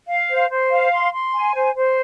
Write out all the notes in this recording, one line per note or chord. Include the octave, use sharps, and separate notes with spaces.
F5
C5
C5
F5
C6
C6
G#5
C5
C5